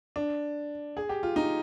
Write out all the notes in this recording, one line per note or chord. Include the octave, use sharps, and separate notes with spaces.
D4
G#4
G4
F4
D#4